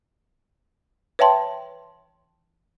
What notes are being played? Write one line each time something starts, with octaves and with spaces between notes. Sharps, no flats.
B4 C#5 E5 G5 A5 C6